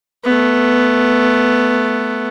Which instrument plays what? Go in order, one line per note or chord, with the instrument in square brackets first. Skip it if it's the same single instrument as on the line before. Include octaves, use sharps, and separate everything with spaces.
[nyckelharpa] A3 B3